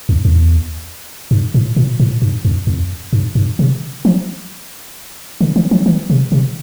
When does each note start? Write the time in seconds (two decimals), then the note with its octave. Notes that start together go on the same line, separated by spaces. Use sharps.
0.09 E2
0.25 E2
1.31 G2
1.54 A2
1.76 A#2
2.00 A2
2.22 G2
2.45 F2
2.67 F2
3.13 G2
3.35 G2
3.59 C3
4.05 F3
5.41 D3
5.56 E3
5.71 F3
5.86 E3
6.10 C3
6.32 C3